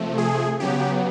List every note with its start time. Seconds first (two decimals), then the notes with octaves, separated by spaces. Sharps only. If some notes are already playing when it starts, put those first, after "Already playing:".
Already playing: C3 F3 A3
0.18 G#4
0.60 C#3 F#3 B3 G4